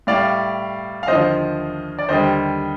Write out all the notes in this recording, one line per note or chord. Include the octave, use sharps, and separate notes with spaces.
A2 G3 D5 F5
F5
D#2 D3 F3 C5 D#5
D5
D#2 D3 G3 C5 D#5